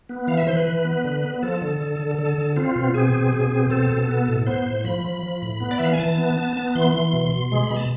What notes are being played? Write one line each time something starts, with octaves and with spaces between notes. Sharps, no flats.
B3
E3 F5
E5
E3 C5
B4
E3
B3
D3
B3
F3 A4
D3
D3
D3
D3 A4
D3
C4 F4
B2
C4 G#4
B2
B2
C4
B2 A4
B2
B3
A2
B3 C5
A2
F3 B5
F3
F3
A2
B3
D5
E3 E5
F5
G#5
E3 A5
B3
B3
B3
E3 C6
E3
B2
B2
G#3 C6
B5
B2
A5